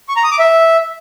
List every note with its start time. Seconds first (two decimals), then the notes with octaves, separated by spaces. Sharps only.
0.09 C#6
0.16 A#5
0.24 D#6
0.32 D6
0.39 E5